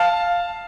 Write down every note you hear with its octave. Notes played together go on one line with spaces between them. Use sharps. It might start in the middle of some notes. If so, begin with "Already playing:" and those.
Already playing: F5 A5